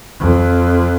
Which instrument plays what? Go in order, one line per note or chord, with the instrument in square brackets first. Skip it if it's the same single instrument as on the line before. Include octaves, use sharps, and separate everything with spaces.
[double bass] F2